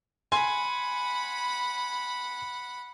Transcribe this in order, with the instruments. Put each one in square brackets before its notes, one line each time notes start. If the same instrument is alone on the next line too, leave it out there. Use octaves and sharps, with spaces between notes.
[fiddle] F#5 B5 [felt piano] G#5 C6